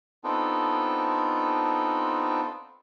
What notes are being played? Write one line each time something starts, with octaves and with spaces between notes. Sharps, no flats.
B3 C4 D4 D#4 F4 A4